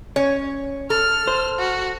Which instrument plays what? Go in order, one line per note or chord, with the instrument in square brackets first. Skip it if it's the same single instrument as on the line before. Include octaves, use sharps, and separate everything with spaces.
[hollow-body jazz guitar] C#4 [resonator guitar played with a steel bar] C#5
[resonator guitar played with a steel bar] A4 [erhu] F6
[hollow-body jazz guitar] C5
[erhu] F#4